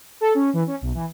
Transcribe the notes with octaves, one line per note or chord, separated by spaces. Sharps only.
A4
C#4
E3
C#4
B1
E3